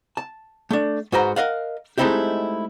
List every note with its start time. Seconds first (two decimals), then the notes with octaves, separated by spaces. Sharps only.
0.17 A5
0.71 A3 D4
1.12 G#2 F#4 B4 C5 A#5
1.36 A#4 D#5 F5 F#5
1.98 G#3 A3 C4 D#4 E4 G4